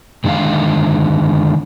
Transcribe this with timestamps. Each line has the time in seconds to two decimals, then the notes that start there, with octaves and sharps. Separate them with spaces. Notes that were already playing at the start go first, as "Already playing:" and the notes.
0.24 G2 D3 D#3 G#3 F5